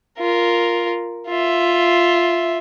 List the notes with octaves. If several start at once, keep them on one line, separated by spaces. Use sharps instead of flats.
F4 A#4
F4 E5